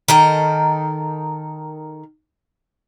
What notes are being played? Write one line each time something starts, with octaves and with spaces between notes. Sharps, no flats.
D#3 A4 A#4 A#5